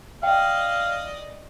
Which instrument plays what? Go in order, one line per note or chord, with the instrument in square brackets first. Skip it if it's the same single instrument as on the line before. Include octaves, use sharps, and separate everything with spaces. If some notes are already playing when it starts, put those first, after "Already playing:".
[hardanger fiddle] D5 D#5 [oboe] F5 [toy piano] G5